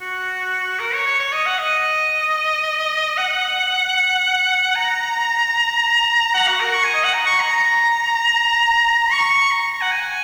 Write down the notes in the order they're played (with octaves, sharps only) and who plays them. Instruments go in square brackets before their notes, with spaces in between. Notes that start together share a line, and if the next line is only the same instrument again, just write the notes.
[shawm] F#4
A#4
C#5
C#5
C#5
D#5
F#5
D#5
F#5
A#5
F#5
F#4
A#4
C#6
G#5
D#5
F#5
A#5
C#6
A#5
A#5
C#6
A#5
F#5
G#5